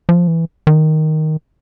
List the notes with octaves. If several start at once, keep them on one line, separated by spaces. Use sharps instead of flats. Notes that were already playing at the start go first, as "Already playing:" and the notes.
F3
E3
D#3